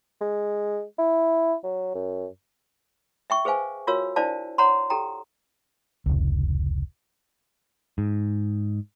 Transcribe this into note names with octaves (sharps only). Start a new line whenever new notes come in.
G#3
E4
F#3
F#2
E5 G5 C#6
G#4 B4 C5 F5 G#5
F4 F#4 A#4 C#5 F5 E6
D4 E4 C5 D5 F5 A5
C#5 F#5 A#5 C6
G4 A4 G5 A#5
F1 C#2
G#2